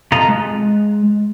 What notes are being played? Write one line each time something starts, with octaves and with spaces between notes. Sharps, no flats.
C3 F4 A4 D#5 A#5
G#3